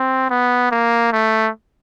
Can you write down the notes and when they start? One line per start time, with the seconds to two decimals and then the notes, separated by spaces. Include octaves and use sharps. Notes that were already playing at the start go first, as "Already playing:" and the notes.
Already playing: C4
0.30 B3
0.72 A#3
1.13 A3